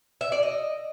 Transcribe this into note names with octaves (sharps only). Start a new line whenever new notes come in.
E5
D5
D#5